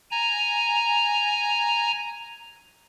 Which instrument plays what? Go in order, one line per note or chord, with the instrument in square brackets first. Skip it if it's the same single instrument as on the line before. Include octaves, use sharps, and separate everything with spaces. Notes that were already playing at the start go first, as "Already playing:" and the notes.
[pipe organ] G#5 A#5